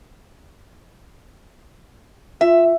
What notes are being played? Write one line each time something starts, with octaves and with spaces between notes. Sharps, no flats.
F4 E5